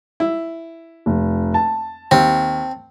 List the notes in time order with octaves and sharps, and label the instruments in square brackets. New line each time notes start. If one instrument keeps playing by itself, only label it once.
[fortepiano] E4
[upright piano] F1
A5
[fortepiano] D#2 [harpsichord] C4